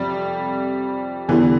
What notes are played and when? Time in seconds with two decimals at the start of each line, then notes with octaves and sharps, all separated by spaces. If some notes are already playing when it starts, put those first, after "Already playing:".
Already playing: F2 C3 F3 G3
1.28 E2 D3 E3 G3 B3